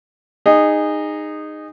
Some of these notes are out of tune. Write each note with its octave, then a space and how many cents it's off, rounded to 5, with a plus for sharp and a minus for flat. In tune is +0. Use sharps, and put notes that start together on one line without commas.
D#4 -15 G#4 -20